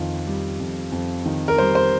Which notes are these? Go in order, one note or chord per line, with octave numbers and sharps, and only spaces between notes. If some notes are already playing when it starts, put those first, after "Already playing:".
Already playing: F2 D#3 F4
G3
F2
F2
D#3
A#4
G3 C5
C5